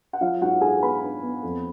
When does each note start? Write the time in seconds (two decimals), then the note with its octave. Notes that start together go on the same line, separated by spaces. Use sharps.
0.13 F#5
0.21 F#3 F4 F5
0.41 G#2 F#4 F#5
0.61 G#2 G#4 G#5
0.82 B3 B4 B5
1.03 D4
1.23 B3
1.43 F2